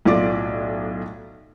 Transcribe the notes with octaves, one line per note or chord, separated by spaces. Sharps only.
B1 A2 F4 D5 D6